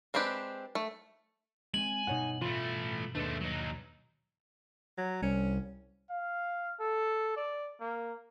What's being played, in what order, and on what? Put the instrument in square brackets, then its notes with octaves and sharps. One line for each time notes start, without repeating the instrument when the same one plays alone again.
[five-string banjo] G#3 C4 D4 G4 B4
A3
[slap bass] G#3 B3 C4 [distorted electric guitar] G#5 [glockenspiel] F#7
[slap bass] G2 B2 [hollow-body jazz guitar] D#4 C#5 F#5
[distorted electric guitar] E3 A3 [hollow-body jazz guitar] F4
[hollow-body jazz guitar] D#2 D4 B4 [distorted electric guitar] G#3 A3
[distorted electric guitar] F#3 D#4
[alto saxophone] F#3
[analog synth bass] C2 [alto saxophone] C#4
[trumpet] F5
A4
D5
A#3